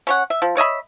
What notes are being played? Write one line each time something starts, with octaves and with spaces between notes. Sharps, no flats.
C#4 C#5 F#5
E5
F3
C#5 D#5 E5 B5